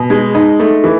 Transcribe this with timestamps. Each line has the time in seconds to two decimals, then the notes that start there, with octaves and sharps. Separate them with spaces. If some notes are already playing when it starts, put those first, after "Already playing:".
Already playing: B2
0.10 G#3
0.35 D#4
0.60 A3
0.84 E3